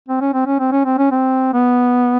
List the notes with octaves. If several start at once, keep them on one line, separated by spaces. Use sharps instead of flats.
C4
C#4
C4
C#4
C4
C#4
C4
C#4
C4
B3